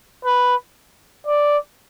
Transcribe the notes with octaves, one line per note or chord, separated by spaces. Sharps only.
B4
D5